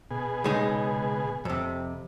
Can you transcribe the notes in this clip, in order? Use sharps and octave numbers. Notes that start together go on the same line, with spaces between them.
B2 G#4
C#2 G#3 D#4
F2 C3